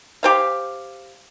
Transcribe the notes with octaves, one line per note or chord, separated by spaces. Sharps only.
G4 C5 F5